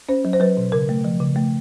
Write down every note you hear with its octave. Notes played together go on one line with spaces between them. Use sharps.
C#4 C5
F#3
C5
F#3 B4
B2
C#3 A#4
A3
F3
C#3
A3